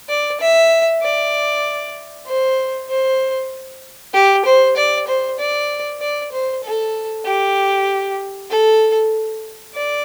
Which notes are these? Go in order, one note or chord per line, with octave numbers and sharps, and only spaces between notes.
D5
E5
D5
C5
C5
G4
C5
D5
C5
D5
D5
C5
A4
G4
A4
D5